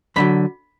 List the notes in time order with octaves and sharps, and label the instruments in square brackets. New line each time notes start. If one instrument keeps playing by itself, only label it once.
[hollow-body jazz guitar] F2 D3 F#3 B5